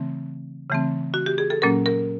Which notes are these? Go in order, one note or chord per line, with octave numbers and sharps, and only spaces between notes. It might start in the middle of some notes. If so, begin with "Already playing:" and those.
Already playing: C#3 E3 A3 C4
C#3 E3 A3 C4
F#4
G4
G#4
A4
A#2 F#3 A#3 C#4 A#4
A#4